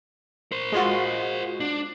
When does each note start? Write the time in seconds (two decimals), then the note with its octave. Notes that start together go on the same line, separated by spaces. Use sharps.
0.52 A#4 C5
0.72 G#3 F4 F#4
1.60 D4